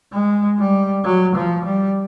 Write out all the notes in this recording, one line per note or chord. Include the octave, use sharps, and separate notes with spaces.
G#3
G3
F#3
F3
G3